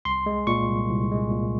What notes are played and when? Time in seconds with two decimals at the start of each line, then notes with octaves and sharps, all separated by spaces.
0.05 C2 C6
0.26 G#3
0.47 A#2 C#6
0.68 C2
0.90 C2
1.12 G#3
1.32 A#2